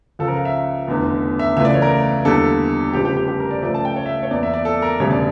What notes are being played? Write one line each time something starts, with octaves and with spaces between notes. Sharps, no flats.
C#2 C#3 F3 A4
A#4
F5
E5
F1 E2 D3
E5
C#2 C#3 E3 A3 E5
D5
C#5
A#4
E2 D3 G3 A#3 A4
F1 F2 C#3 G3 G4
G4
G4
G4
A#4
D5
C#2 C#3 F3 A3 D5
A5
G5
C#5
E5
C#5
E2 E3 A#3 D5
E5
D5
A4
A#4
E1 D2 C#3 G3 C#5
D5